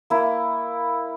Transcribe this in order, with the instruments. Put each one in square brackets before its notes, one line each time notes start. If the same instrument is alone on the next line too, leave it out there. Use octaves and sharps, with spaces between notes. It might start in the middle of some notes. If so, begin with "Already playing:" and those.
[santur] A#3 E4